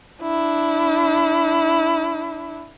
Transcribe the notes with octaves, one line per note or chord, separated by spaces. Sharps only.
D4 E4